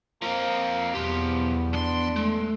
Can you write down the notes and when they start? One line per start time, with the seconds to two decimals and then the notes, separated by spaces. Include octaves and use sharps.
0.22 F3 A#3 C4
0.95 B1 E2 F3 B3 G4
1.73 F2 D4 C6
2.16 G#3 A3